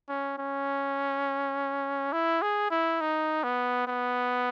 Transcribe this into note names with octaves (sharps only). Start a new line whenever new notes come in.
C#4
C#4
E4
G#4
E4
D#4
B3
B3